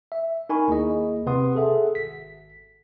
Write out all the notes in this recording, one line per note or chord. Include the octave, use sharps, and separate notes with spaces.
E5
D#4 A#4 G#5 B5 C#6
D#2 A#3 E4 G#4 D#5
C3 C4 B4 F#5 C6 D#6
G#4 A4 E5 F#5
G#1 B6